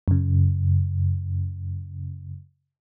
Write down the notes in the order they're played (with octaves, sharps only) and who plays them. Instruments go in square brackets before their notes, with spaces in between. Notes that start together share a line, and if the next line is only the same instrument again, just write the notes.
[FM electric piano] F#2 C#3